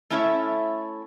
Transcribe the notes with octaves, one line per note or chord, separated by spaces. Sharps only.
A3 C#4 E4 A4 C#5 E5